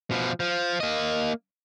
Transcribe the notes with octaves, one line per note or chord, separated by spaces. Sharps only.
B2 F3
F3
A#3 D#5